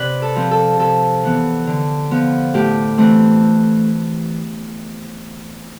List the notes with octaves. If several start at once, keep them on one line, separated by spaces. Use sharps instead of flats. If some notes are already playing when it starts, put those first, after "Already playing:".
Already playing: C3 B4 D5
A4
F3 C4
A4
C3 A4
E3 B3
D3
F3 B3
A2 G4
E3 A3 C4